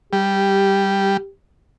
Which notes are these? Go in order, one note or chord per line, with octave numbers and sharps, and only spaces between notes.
G3 G4